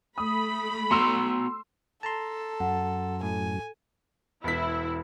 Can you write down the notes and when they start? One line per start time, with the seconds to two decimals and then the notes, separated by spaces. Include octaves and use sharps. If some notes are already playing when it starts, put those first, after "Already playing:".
0.18 A3 B5 D#6
0.91 B3 F#4 A#5 C6 E6
2.03 A4 A5 A#5 C6
2.60 F#2 F#5
3.23 A2 A4 G#5
4.44 E1 E4 B6